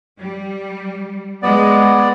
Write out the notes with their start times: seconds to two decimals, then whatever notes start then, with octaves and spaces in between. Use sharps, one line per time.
0.19 G3
1.42 G#3 B3 D5